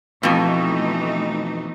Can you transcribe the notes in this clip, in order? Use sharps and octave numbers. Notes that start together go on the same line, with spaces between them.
F2 B2 E3 A3 D#4